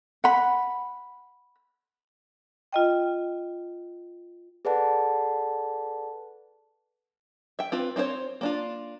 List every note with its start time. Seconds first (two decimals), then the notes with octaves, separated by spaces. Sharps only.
0.24 F#5 B5
2.73 F4 D#5 G5
4.65 G#4 A4 B4 D5 F#5 A5
7.59 E5 G5
7.72 C4 F4 B4
7.96 C4 C#4 E4 C5 C#5
8.41 A#3 D4 F4